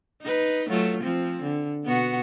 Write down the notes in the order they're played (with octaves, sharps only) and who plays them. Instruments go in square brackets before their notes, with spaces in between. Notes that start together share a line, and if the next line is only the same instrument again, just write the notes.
[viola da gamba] D#4 B4
F#3 A3 F4
F3 C4
D3
B2 B3 F#4